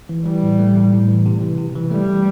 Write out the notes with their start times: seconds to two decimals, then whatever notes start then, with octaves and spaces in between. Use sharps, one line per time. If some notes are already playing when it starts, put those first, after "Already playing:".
0.09 E3
0.26 E3 G3
0.43 A2
0.59 A3
0.76 A2
0.93 A2
1.08 E3
1.26 C3
1.41 E3
1.58 C3
1.75 E3
1.91 G3 A3
2.07 E3